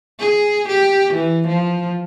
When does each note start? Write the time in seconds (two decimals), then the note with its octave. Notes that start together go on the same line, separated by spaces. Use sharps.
0.20 G#4
0.68 G4
1.13 E3
1.48 F3